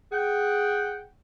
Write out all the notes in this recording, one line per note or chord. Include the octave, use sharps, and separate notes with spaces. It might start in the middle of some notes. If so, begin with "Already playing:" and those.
G#4 F#5 G5